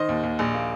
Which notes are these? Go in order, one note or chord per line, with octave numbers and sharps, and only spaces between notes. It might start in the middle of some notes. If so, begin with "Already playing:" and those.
Already playing: D#3 C5 D#5
D#2
D#2
A#1
A#3